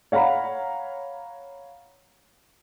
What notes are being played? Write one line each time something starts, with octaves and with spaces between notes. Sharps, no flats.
C#5 F5 F#5 A#5 B5